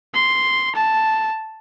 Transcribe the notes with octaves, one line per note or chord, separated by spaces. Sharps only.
C6
A5